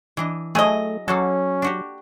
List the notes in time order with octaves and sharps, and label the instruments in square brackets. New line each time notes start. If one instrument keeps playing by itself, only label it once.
[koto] E3 D4 D#5
[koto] F#3 E4 [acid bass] A3 [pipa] G#4 D#5
[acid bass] F#3 [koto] A#3 F#4 A4 [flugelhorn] C#4
[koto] D4 F#4 G4